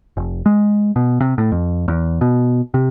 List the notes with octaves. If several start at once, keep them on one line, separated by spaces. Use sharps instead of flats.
F1
G#3
B2
C3
A2
F2
E2
B2
C3